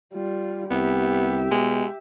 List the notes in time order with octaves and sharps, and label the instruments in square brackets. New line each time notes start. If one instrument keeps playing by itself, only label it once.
[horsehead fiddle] G3 F4
[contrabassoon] C2 [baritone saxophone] B3 [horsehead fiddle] G4 E5
[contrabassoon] B2 [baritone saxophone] G#3